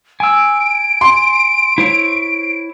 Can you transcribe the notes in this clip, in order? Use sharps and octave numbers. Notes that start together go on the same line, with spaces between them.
G#5 E6 D7
C6
E4 C5 C#5